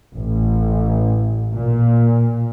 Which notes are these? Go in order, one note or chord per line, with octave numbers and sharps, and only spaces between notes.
A1
A#2